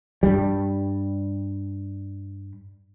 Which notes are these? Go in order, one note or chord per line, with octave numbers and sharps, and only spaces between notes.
G2 G3